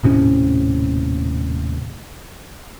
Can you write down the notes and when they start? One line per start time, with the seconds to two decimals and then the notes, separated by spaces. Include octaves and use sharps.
0.03 D#1 A2 C3 C#4